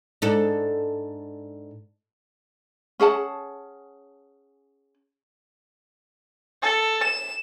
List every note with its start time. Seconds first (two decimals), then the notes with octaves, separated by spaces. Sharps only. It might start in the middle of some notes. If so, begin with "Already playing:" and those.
0.22 G#2 D4 A4
3.00 C#4 G#4 F#5 A5
6.62 A4
7.04 E7